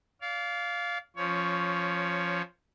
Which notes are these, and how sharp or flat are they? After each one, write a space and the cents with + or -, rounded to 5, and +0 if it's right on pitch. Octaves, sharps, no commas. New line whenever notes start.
D5 -35 F5 +0
F3 +0 C#4 -5 C#5 +15